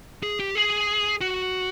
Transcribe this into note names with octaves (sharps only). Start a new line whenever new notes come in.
G#4
G4
G#4
F#4